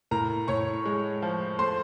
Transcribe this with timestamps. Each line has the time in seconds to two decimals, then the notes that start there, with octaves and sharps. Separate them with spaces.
0.11 A2 A#4 A#5
0.48 A2 C#5 C#6
0.86 G#3
1.22 F3
1.59 A3 C5 C6